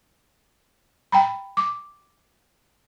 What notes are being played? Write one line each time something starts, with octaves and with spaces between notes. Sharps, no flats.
G5 A#5 B5
D6